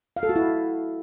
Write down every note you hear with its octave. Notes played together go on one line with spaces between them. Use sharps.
F5
A4
F#4
E4